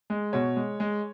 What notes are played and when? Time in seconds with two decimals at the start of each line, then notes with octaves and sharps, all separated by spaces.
0.10 G#3
0.33 B2 C#5
0.56 G#3
0.80 G#3